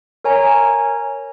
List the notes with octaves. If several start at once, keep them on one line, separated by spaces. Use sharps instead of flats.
A#4 C#5 G#5 A#5